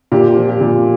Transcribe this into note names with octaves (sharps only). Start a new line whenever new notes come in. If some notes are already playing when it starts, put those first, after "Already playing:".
A#2 G4
F3
G4
A#2